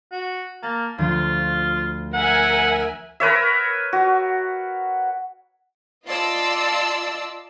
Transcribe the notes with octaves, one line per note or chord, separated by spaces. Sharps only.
F#4
A#3 A5 A6
D2 F3 F4
A#4 E5 F#5 G#5
A#4 B4 C#5 E5
F#4
F4 D5 D#5 A5 C6 E6